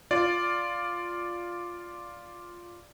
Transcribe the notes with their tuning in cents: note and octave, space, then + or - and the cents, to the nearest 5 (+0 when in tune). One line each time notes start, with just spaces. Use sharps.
F4 +0 D5 +0